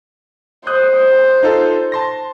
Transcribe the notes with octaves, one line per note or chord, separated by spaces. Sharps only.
C5 D#6 F#6 G6
D#4 F4 A4
A5 C6 A#6